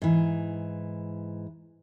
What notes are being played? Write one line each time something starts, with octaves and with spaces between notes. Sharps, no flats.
G#2 E3